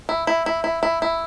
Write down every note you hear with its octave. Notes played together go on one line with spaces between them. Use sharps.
E4
E4
E4
E4
E4
E4